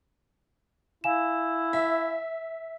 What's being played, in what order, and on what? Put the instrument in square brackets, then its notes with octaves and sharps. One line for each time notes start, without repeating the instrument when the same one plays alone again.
[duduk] E4 [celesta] F5 G#5 E7
[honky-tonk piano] E5